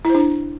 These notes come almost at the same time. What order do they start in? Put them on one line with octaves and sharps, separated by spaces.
E4 C5 D4